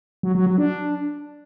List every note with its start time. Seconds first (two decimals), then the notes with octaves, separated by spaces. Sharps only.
0.23 F#3
0.35 F#3
0.46 F#3
0.58 D4